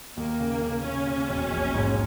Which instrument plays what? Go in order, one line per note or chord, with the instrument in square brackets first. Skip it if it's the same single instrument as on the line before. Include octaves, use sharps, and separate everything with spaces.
[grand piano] D#2 [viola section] A#3
[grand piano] C#3
C#3
[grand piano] C#3 [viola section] C#4
[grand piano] C#3
E1
A#1
G#2